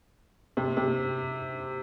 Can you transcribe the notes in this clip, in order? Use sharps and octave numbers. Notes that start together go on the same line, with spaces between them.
C3
C3